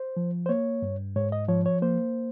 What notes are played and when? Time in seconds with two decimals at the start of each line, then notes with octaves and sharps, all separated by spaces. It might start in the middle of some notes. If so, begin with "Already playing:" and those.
Already playing: C5
0.17 F3
0.46 C5
0.49 A#3 C#5
0.82 G2
1.16 G#2 C#5
1.32 D#5
1.48 F3 C#5
1.66 C#5
1.82 A#3 C5